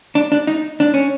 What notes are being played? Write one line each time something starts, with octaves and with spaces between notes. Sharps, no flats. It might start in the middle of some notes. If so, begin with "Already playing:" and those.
D4
D4
D#4
D4
C#4